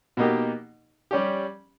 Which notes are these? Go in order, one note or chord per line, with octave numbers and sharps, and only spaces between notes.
B2 A#3 D#4 G4
G3 C#4 G4